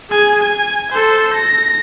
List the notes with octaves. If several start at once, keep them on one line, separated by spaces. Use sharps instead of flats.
G#4 G#5
G#5
A4 C5
A#6